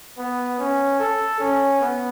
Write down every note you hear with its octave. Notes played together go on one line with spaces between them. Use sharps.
B3
C#4
A4
C#4
B3